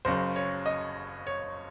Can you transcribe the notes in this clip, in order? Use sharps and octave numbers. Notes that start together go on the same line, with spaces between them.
F#1 F#2 C#3 C5
C#5
D#5
C#5